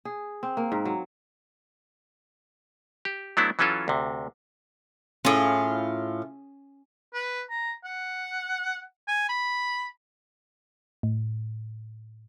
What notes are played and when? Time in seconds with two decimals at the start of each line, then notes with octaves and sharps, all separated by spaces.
0.05 G#4
0.43 C4
0.57 A#3
0.72 G#2
0.85 F#3
3.05 G4
3.37 F#3 A3 B3 D4 E4
3.59 E3 F#3 C#4 F4 A4
3.88 D2 C3
5.25 A2 C#4 F4 G#4
7.14 B4
7.50 A#5
7.84 F#5
9.08 G#5
9.29 B5
11.03 A2